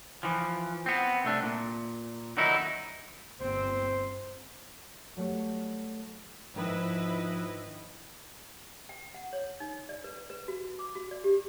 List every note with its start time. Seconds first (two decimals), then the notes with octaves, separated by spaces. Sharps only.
0.23 E3 F3
0.86 B3 C4
1.25 C2 A3 D4
1.43 A#2
2.37 D3 D#3 F#3 D#4 E4
3.40 G1 C4 C5
5.17 F#3 G3 A3
6.54 G#2 D#3 F3 D4 E4 B4 D#5
8.89 G5
9.15 F#5
9.33 C#5
9.60 D#4
9.89 D5
10.04 B4
10.30 B4
10.48 F#4
10.79 D6
10.95 F#4
11.11 D5
11.24 G4